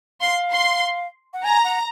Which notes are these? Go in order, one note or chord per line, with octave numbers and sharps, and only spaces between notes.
F5 C6
C6
F#5
G#5 A#5
F#5